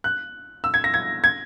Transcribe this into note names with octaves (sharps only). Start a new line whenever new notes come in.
F#6
E6
G#6
A#6
G#6
G#6